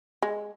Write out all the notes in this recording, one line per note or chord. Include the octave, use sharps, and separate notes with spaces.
G#3